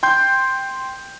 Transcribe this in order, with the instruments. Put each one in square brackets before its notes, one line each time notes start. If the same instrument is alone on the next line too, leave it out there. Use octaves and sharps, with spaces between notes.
[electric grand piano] G5 C6 G6